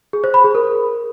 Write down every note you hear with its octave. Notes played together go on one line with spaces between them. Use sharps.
G#4
C5
B5
G#4
A#4